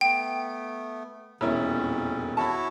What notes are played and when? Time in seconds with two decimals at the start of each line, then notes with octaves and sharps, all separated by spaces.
0.01 A3 B3 G5
1.41 E1 F2 A#2 D#3 C#4 E4
2.37 E4 F#4 C#5 A5 B5